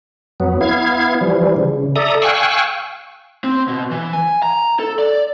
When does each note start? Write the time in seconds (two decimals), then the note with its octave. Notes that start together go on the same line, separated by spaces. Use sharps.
0.40 F2 F#3 B3
0.61 B3 E4 F5 G#6
1.21 E3 F3 G3
1.56 C#3
1.96 A4 D5 E5 A#5 D#6
2.22 F5 G5 G#5 C#6 E6 F#6
3.44 C4
3.68 B2
3.91 E3
4.13 G#5
4.43 A#5
4.80 A4
4.99 D5